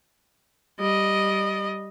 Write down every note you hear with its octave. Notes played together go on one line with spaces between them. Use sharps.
G3 D#5